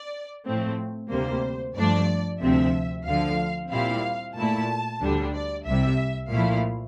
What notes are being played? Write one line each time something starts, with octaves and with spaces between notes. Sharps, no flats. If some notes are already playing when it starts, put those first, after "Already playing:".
Already playing: D5
A2 F3 A3 C4
D2 C3 G3 A#3 C5
G2 F3 A3 D4 D5
D2 C3 F3 C4 E5
D2 D3 F3 F5
A#2 G3 C4 E4 F5
A#2 A3 E4 A5
D2 D3 G3 D4
D5
C2 C3 G3 E5
A#2 F3 A3 E4 F5